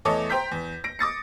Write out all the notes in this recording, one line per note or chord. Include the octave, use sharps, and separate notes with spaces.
E2 A3 A4 C#5 D#5 D6
C5 G5 A#5 G6 B6
E2
A#6 D7
D6 D#6 A6 C#7